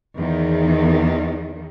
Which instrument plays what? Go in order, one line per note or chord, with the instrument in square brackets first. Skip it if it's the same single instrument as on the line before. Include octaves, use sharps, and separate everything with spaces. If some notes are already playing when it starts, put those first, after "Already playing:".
[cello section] E2 D#3